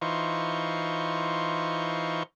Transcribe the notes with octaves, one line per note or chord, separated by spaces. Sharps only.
E3 D#4 F4 C5 C#6